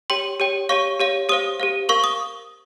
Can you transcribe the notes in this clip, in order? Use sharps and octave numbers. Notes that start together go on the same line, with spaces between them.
G4 C#5 G5 C6
G4 C#5 G5
G4 C#5 F5 C#6
G4 C#5 F5
G4 C5 F5 D#6
G4 C5 F5
A#4 F5 C#6
D#6